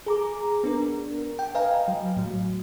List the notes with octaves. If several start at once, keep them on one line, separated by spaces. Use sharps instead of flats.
G#4 A#5 D6
B3 D4 A#4
G5
B4 D#5 F5 G5 G#5 A#5
F#3
A2 F#3